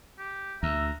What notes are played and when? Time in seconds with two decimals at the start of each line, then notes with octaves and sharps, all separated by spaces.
0.19 G4
0.63 D2 E5 A#5